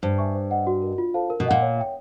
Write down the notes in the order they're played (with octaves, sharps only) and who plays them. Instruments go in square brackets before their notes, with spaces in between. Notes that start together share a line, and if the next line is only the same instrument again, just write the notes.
[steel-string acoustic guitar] G2 [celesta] C5
[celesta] E5 G#5 C#6
C5
D#5 F#5
F#4
A#4 D#5
F4
A4 C5 F5 A5
A#4
[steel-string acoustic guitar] B2
[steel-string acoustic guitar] A#2 [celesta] D#5 F#5
[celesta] C#5
E5 G5